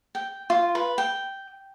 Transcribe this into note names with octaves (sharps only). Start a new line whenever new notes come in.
G5
F4
B4
G5